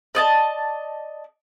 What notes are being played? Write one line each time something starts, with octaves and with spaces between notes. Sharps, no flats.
D5 D#5 A5